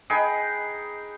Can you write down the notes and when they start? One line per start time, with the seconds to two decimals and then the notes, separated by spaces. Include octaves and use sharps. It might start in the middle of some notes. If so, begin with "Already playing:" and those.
0.10 D#4 G#4 B4 G5